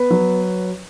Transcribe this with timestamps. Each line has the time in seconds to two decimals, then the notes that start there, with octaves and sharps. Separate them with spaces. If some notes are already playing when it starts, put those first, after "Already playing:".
Already playing: B3 B4
0.10 F#3